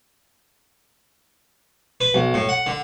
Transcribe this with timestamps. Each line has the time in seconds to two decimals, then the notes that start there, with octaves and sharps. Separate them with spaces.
2.01 B4
2.14 B1
2.34 A2
2.49 F#5
2.66 D3